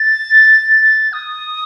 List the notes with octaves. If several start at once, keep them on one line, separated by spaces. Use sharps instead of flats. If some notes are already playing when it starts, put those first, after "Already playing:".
Already playing: A6
D#6